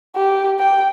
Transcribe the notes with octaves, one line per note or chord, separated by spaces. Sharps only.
G4
G5